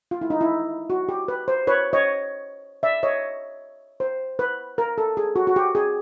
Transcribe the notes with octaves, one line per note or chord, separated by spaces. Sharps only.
F4
E4
D#4
E4
F#4
G4
B4
C5
B4 C#5
C#5 D#5
D5 E5
C#5 D#5
C5
B4
A#4
A4
G#4
F#4
F#4
G4
G#4